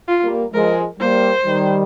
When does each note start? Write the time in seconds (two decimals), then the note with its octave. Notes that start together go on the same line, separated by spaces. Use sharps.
0.08 F4
0.23 G3 A#3
0.53 F3 G#3 A#4
0.99 G3 A#3 C5
1.45 D#3 G3